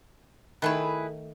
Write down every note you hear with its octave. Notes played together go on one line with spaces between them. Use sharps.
D#3 A3 E4 G#4 B4